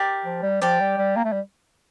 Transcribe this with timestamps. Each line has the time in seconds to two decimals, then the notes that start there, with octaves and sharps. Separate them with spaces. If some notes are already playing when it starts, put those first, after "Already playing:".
Already playing: G4 A#4 D5
0.25 F3
0.43 G3
0.61 F3 G4 D5 G5
0.80 G3
0.98 G3
1.16 A#3
1.24 A3
1.32 G3